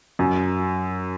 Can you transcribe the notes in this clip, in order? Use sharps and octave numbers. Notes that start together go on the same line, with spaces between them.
F#2